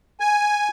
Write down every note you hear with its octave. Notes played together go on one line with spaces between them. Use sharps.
G#5